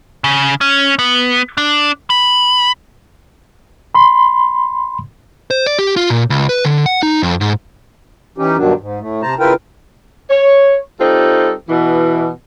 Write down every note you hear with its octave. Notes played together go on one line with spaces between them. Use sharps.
C#3
C#4
B3
D4
B5
B5 C6
C5
D5
G4
F4
A#2
C#2
B4
D3
F#5
D#4
F2
G#2
E3 C#4 D#4 G4
G2 B2 D#3 F#3 D4
G#2
A2 A3
C3 C5 A5 A#5
C#3 E4 F4 A#4 B4 G5
C#5
G3 C4 D#4 F4 A4
B2 E3